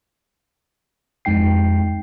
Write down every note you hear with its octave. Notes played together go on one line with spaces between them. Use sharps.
F2 G#3 D#4 G5 C7